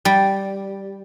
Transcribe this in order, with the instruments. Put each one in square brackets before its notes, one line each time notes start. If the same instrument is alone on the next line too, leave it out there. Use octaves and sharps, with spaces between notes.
[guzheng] G3